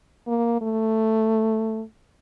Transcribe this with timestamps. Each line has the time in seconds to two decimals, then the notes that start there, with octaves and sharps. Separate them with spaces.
0.27 A#3
0.62 A3